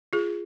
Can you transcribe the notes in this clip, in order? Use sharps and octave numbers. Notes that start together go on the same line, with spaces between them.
F4 G#4